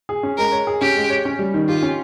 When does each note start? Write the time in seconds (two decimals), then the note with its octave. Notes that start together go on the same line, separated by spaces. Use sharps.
0.09 G#4
0.23 C#4
0.38 G#3 A#4
0.52 C#5
0.67 G#4
0.81 C#4 G4
0.96 G#3
1.10 C#5
1.25 C#4
1.39 G3
1.54 D#3
1.68 F4 G4
1.83 C#4